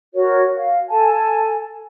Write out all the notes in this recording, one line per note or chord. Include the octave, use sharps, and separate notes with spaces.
F#4 A#4 C#5
F5
A4 G#5 A5